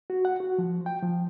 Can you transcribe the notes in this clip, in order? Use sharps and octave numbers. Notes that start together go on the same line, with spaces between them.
F#4
F#5
F#4
F3
G5
F3